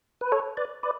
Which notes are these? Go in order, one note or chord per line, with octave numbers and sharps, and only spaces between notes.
B4
A4 C#5
B4 D5
B4 D5